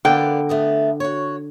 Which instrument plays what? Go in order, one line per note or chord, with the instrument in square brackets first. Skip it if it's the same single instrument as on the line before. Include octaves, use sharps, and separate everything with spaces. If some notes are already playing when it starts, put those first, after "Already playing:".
[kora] D3 [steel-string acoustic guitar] A#3 B3 D4 [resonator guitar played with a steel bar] G5
[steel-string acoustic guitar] A3 B3 D#5
F#4 C#5